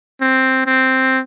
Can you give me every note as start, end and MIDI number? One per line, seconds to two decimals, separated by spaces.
0.21 0.62 60
0.66 1.21 60